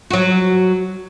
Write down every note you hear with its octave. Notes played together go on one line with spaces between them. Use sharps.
F#3 F#4